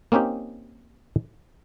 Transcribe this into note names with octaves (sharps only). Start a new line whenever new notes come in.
A#3 C4 C#4 D#4 G4